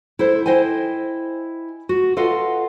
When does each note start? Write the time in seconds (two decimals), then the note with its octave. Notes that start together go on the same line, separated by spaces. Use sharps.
0.19 E4 A4 C5 D5
0.46 E4 C5 D#5 G5 G#5
1.89 F#4
2.17 F4 A4 B4 D#5 F5 F#5